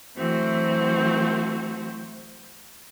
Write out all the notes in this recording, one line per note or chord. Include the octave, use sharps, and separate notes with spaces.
E3 F#3 A3 C4 F#4 C5